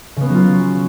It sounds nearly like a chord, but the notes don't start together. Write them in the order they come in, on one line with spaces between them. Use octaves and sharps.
C#3 B3 C#4 F#3 F4